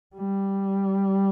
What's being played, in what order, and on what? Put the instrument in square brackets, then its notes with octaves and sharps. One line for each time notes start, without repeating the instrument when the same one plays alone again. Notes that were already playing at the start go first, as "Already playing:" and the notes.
[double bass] G3